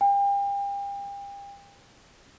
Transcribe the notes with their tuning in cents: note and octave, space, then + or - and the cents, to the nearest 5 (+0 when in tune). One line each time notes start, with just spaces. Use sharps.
G5 +35